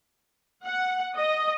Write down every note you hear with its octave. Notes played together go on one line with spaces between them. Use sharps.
F#5
D#5